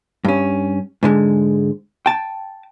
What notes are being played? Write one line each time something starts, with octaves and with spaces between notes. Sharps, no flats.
G2 C#4
G#2 D3 G#3
G5 A5